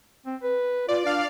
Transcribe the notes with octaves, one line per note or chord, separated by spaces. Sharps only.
C4
B4
F4 D5
D4 D5 F5